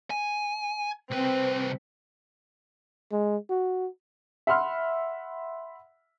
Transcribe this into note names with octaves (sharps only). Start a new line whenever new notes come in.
G#5
C2 C4 B4
G#3
F#4
E5 F#5 B5 C6 F6